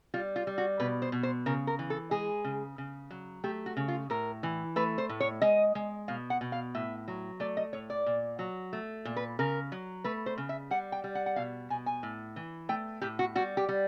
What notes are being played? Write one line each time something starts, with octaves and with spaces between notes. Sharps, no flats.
G3 F4
F4
G3
F#4
B2 B4
C5
B2
C5
C#3 A#4
A#4
E3
A4
G#3 G#4
C#3
C#3
F#3
A3 G4
F#4
C#3
F4
A2 A#4
E3
A3 B4
C5
A2
C#5
G#3 D#5
G#3
B2 F5
F#5
B2
F5
A2 E5
F#3
A3 D5
D#5
A2 C#5
D5
A#2
F#3
A3
A#2
B4
C#3 A#4
F#3
A3 B4
C5
C#3
E5
G3 F#5
G5
G3
F#5
F#5
B2 F5
B2 G#5
G#5
A2
E3
A3 G5
A2 G4
F#4
G3 F#4
G4
G3